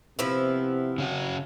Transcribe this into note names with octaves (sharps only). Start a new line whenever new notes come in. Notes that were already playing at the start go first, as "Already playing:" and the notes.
C3 F3 B3 E4
C#3 C#4 F#4